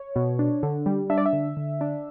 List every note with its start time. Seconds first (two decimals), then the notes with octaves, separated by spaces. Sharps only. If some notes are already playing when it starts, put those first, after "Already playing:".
Already playing: C#5
0.16 B2
0.39 D4
0.63 D3
0.86 G3
1.10 D4 E5
1.18 D5
1.26 E5
1.33 D3
1.57 D3
1.81 D4